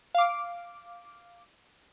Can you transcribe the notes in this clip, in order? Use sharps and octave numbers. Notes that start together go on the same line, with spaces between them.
F5 D6